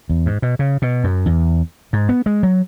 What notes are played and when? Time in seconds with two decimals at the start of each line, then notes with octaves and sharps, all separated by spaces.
0.10 E2
0.26 G#2
0.42 B2
0.59 C#3
0.82 B2
1.04 F#2
1.26 E2
1.93 G#2
2.09 B3
2.26 G#3
2.43 F#3